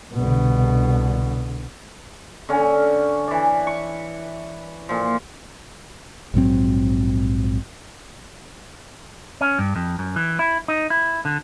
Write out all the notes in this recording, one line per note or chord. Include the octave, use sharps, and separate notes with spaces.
C2 B2 D3
D3 C#4
E3 D5
C#6
A#2 F3
A#1 G#2 F#3 C4
C#4
G2
F2
F#2
E3
E4
D#4
E4
D3